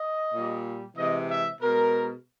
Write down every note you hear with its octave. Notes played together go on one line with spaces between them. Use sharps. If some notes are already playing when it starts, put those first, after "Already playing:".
Already playing: D#5
A#2 G3
C3 E3 G#3 D#5
E5
B2 G#3 A#4